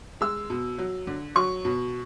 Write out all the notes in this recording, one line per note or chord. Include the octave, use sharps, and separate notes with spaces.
G#3 E6
B2
F#3
D3
F#3 C#6
B2